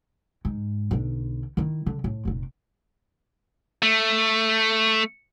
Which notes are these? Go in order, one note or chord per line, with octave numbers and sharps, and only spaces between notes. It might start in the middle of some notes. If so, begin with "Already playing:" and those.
G#2
B1 D3
D#3 E4
D3
A2
F1 A#2
A3